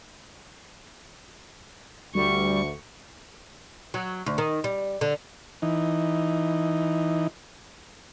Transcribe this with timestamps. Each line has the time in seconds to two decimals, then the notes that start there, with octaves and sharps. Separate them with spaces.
2.15 D2 G3 C#6
3.94 F#3
4.26 D2
4.38 D#3
4.64 G3
5.01 D3
5.62 E3 D#4